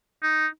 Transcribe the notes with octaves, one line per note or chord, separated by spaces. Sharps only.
D#4